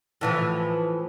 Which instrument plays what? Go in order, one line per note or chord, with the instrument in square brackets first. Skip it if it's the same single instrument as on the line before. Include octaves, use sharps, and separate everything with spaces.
[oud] A2 E3 F3